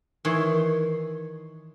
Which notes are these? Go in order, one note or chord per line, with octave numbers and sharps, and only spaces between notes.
D#3 E3 C#5 C6